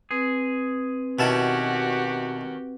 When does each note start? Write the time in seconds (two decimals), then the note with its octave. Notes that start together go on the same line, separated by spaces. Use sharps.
0.11 C4 G#4 B4
1.19 B2 D#3 C#4 E4 F#4 G4 A5